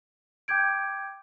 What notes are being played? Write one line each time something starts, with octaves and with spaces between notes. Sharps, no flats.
G5 D6 G6 G#6 D7